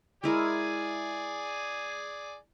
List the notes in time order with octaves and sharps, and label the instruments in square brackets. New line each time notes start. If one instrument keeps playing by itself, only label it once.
[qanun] G#3 E4 A#4 [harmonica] G#4 D5 G#5